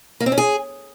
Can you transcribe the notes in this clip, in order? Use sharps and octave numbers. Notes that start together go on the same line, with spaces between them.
A#3
C4
C#4
G#4